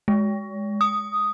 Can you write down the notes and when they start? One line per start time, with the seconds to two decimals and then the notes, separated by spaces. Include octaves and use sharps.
0.08 G#3
0.81 D#6